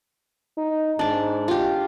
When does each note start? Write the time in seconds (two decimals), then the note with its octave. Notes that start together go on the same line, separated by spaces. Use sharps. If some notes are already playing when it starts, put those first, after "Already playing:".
0.57 D#4
0.99 G#2 D4 D5
1.48 F4 G4